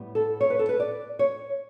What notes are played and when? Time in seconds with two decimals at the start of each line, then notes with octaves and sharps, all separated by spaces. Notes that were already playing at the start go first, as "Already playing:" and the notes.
Already playing: A2 G3 B3
0.15 A4
0.41 C#5
0.50 B4
0.59 A4
0.69 B4
0.80 D5
1.19 C#5